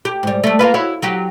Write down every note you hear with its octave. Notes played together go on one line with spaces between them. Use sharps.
G4
G#2 G3
G3 A3
A#3 F4 B4
E4 F#4 C#5
F#3 F#4 G4